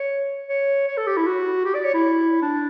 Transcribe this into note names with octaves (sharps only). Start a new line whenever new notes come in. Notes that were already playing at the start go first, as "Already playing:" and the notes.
Already playing: C#5
C#5
C#5
A4
G4
E4
F#4
G4
D5
C#5
E4
D4